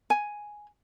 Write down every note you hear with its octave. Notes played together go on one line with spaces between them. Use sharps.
G#5